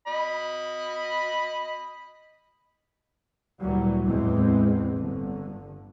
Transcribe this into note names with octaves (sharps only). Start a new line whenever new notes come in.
D#5 B5
D2 A#2 E3 F#3 G3
E2 A2 E3 G#3 C4
G1 D3